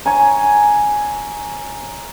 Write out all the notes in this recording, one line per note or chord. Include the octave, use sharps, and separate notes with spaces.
C#5 G#5 A#5